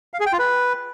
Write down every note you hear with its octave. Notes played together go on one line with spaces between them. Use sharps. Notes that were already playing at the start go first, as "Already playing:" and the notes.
F5
G#4
G5
F4
B4